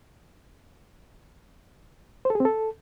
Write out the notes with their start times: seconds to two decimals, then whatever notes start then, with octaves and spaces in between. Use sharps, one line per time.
2.25 C5
2.30 A4
2.35 G#4
2.40 C4
2.45 A4